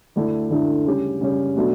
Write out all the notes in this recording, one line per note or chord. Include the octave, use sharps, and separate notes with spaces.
D2 D3 A3 E4
D2 D3 A3 E4
C#3 G3 C#4 G4
C#3 G3 C#4 G4
B2 F#3 A3 D4